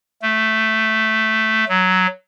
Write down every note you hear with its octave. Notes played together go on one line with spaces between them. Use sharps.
A3
F#3